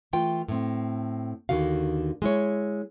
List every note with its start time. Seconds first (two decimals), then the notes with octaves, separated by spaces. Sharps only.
0.13 E3 A3 F4 G5
0.48 A2 C4
1.49 D#2 D3 D#3 F#4 F5
2.22 G#3 E4 C#5